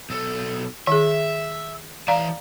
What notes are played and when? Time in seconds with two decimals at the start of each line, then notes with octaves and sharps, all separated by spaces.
0.10 B1 A4
0.87 D#3 G#4 E5
2.08 E3 D5 F5 A5 A#5